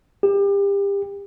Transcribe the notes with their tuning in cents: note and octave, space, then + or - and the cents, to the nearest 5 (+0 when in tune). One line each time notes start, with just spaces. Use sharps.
G4 +30